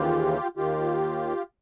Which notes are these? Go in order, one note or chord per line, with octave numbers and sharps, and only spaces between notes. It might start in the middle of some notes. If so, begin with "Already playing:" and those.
Already playing: D#2 C#3 E3 F4 G4
D#2 D#3 F4 G4